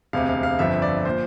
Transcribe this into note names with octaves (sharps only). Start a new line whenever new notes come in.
E1 D2 C3 F5
F5
F5
G1 F2 D3 F3 E5
D5
A#2 F3 C5